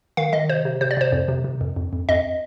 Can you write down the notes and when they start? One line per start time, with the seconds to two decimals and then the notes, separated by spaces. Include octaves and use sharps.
0.17 D#3 F5
0.33 D#3 D#5
0.49 C3 C5
0.65 C3
0.81 C3 C5
0.91 D5
0.97 C3 C5
1.12 F2
1.28 C3
1.44 C3
1.61 F2
1.76 F2
1.93 F2
2.09 F2 D#5